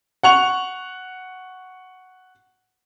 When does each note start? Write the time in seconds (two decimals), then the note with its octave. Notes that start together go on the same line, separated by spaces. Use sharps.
0.23 F#5 C#6 F7